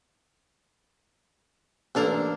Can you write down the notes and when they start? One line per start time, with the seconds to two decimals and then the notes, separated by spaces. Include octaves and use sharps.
1.95 A1 A#3 D4 A4 C5